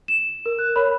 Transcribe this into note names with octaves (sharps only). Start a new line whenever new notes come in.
E7
A#4
F#6
A#4 C#5 B5